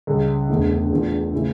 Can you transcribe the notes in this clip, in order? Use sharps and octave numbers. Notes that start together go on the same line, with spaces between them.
C#2 C#3 G3
E1 E2 D3 A3 E4
E2 E3 A3 D4 F4
C#3 E3 A3 E4